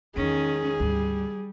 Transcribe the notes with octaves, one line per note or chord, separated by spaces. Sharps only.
E2 D#3 G#3 C#4 G#4
D2 G#2 G3